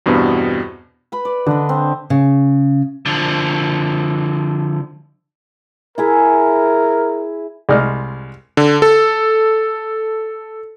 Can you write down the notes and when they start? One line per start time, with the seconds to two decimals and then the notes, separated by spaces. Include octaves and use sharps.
0.06 E2 G2 B2 B3 C4
1.12 B4 B5
1.25 D5
1.46 D3 D4 D#5
1.69 C4
2.10 C#3
3.06 D3 F3
5.98 E4 G#4 A#4 E5
7.69 C2 G#3 D5 D#5 F6
8.57 D3
8.82 A4